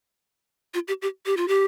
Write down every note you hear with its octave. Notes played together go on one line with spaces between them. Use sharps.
F4
G4
G4
G4
F4
G4